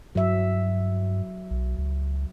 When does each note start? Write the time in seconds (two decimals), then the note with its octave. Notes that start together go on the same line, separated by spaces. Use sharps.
0.15 G2 F#3 E5
1.51 B1
1.78 C#2